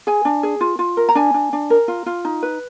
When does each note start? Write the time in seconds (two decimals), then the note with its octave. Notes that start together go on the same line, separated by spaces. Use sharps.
0.07 G#4 G#5
0.25 D4
0.43 G#4
0.61 F4
0.79 F4
0.97 A#4
1.09 A#5
1.15 D4 G#5
1.34 D4
1.53 D4
1.70 A#4
1.88 F4
2.06 F4
2.25 D#4
2.43 B4